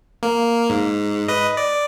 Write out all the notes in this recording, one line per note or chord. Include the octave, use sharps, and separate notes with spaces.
A#3
G#2
B4 D#5
D5